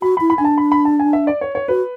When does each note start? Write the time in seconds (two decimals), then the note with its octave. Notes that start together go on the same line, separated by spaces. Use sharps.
0.02 F#4 B5
0.17 B5
0.21 E4
0.30 B5
0.38 D4 G#5
0.45 A5
0.58 B5
0.72 B5
0.85 A5
1.00 G#5
1.13 E5
1.27 D5
1.41 C#5
1.55 C#5
1.68 F#4 B4